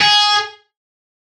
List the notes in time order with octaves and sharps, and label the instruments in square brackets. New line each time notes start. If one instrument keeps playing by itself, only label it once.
[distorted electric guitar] G#4